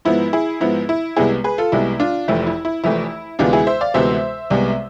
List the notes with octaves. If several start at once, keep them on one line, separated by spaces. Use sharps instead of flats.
G#2 F3 B3 E4
E4 G#4
G#2 F3 B3 E4
E4
C2 C3 G#3 B3 E4 G#4
G#4 B4
F4 A4
C2 C3 G#3 B3 E4
D4 F4
F1 F2 E3 A3 E4
E4
E4
F1 F2 E3 A3 E4
D2 C3 E3 G#3 B3 D4 F4
E4 G#4
C5 E5
D5 F5
D2 C3 E3 G#3 B3 C5 E5
C2 C3 G#3 B3